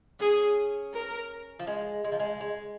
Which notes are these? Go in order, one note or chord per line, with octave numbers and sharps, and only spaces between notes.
C#4 G#4
A#4
F3
G#3
G#3
F3
G#3
G#3